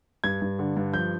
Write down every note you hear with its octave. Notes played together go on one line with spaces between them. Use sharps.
G2 G#6
G2
D3
G2
F3 G6